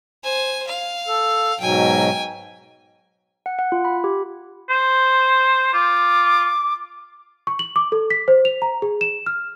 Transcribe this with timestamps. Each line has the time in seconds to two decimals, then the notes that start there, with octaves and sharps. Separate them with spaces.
0.24 C5 G#5
0.67 F5
1.08 A4
1.60 G#2 B2 F#3 G5 G#5
3.46 F#5
3.59 F#5
3.72 F4
3.85 B5
4.04 G4
4.69 C5
5.73 F4 D6
7.47 C#6
7.59 F#7
7.76 D6
7.92 A4
8.10 B6
8.28 C5
8.45 F7
8.62 A#5
8.82 G#4
9.01 E7
9.26 F6